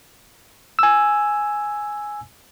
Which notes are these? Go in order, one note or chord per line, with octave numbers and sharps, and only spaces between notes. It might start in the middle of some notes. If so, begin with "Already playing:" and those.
G#5 E6